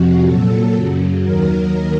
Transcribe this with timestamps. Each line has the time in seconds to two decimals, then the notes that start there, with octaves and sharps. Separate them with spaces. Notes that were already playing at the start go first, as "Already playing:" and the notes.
Already playing: F2 C3 F3 F#4
0.26 A#2 F#3 A4
0.75 F#2 C#3 F#3
1.22 D#2 D#3 F#3 A#4